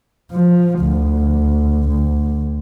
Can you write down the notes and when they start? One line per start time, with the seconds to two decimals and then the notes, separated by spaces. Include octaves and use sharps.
0.32 F3
0.80 D2
1.89 D2